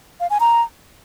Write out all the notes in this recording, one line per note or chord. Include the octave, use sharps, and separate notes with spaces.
F5
G#5
A#5